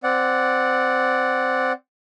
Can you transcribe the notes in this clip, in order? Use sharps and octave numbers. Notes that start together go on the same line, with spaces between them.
C4 D5 F#5